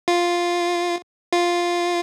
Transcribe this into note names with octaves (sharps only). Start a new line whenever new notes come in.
F4
F4